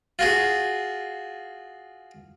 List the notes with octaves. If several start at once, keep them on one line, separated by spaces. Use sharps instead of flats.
F4 F#4 G#4